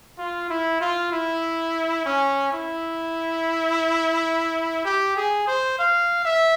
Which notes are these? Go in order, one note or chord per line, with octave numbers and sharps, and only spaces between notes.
F4
E4
F4
E4
C#4
E4
G4
G#4
C5
F5
E5